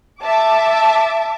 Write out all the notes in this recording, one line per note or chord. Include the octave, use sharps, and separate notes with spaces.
E5 A5 D6